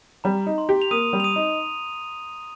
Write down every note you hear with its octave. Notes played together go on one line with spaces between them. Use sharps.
G3 A#5
D#4
C6
G4
F7
A#3 D#6 D#7
G3
F7
D#6 D#7
D#4